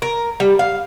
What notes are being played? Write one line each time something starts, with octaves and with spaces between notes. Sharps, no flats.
A#4
G3
F5